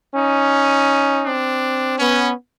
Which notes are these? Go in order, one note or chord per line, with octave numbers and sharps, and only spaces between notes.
C#4 D#4
C4 D4
B3 C#4